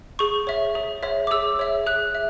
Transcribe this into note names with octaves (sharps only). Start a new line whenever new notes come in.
G#4 C#6
C#5 E5
G#4
C#5 E5
D6
G#4 E6
C#5 E5
G#4 F#6
E5